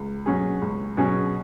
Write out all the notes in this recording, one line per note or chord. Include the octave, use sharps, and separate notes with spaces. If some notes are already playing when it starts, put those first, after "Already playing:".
Already playing: C#2
B2 F#3 C#4 G#4
C#2
B2 F#3 C#4 G#4